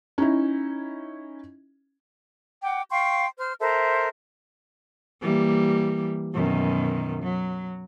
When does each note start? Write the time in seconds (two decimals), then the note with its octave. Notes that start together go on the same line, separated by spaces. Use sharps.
0.18 C#4 D#4 E4
2.63 F#5 G5 D6
2.91 F5 G5 C6 C#6
3.39 C5 F6
3.60 A4 A#4 C5 E5
5.21 E3 G3 A#3
6.34 F#2 B2 D#3
7.23 F#3